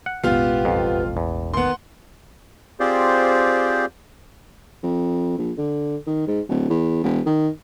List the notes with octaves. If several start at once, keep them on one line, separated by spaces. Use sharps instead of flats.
F#5
E1 A1 B3 F4 G4 F5
F2
E2
D#3 B3 F#5 C6
C4 F4 G4 G#4 C5 D5
F2
A#1
D3
D#3
G#2
D1
E2
E1
D#3